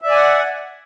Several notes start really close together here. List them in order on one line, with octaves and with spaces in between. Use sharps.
E5 D5 G#5 F#5